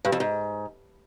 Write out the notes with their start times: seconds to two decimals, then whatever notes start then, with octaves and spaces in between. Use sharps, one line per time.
0.05 G2
0.12 F2
0.20 G#2